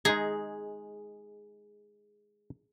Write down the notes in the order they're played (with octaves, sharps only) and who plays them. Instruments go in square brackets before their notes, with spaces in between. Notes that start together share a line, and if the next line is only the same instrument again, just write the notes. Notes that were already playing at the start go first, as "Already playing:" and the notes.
[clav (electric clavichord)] G#3 D#4 A#5 [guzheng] G#4